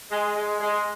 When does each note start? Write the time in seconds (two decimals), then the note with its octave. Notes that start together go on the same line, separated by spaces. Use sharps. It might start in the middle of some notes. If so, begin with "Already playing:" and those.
0.11 G#3
0.36 G#3
0.60 G#3